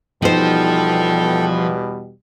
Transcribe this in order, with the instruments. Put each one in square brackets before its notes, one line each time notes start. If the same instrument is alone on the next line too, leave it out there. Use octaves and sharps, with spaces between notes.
[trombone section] E2 B2 G3 [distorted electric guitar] F3 [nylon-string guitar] D#4 C5 [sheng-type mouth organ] A4 G5